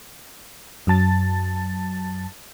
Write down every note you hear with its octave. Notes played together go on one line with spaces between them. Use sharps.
F#2 F#3 A5 A6